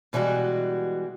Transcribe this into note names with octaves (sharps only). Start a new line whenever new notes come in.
B2 E3 G3 G#3 F#4